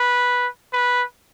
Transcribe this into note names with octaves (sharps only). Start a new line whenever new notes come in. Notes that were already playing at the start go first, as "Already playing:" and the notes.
Already playing: B4
B4